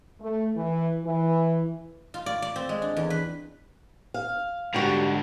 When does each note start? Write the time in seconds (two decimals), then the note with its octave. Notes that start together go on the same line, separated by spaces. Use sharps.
0.19 A3
0.55 E3
1.05 E3
2.14 F4
2.26 D5
2.42 D5
2.56 C4
2.69 G#3
2.82 D4
2.96 E2
3.10 B4
4.14 F5
4.74 G#2 D3 G3 F#4